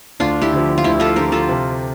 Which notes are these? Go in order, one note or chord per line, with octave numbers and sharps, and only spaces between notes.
D2 D4 F4
E4 G4
D3 F3
F4
D2 E4 G4
F4 A4
D3 F3 G4 A#4
F4 A4
C3